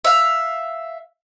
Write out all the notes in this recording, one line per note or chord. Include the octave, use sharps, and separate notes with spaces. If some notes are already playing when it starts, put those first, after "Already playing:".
E5 F5